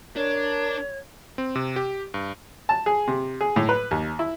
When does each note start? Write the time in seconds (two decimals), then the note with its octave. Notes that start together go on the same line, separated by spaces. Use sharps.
0.16 D4 A#4 C#5
1.38 C4
1.55 C3
1.76 G4
2.14 G2
2.69 A5
2.86 G#4
3.07 C3
3.41 G#4
3.56 A2
3.69 B4
3.91 D#2
4.19 E4